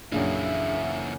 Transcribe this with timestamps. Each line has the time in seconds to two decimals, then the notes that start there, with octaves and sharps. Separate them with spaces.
0.12 A#1 F#2 C#3 E3 D4 G#4 E5